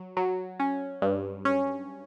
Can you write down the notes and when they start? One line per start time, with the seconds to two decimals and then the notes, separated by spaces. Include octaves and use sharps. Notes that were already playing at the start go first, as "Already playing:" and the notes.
Already playing: F#3
0.17 F#3
0.60 C#4
1.02 G2
1.45 C#4